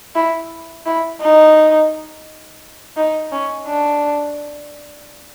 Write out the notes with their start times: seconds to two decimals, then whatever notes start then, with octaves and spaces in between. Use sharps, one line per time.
0.15 E4
0.86 E4
1.21 D#4
2.97 D#4
3.32 C#4
3.67 D4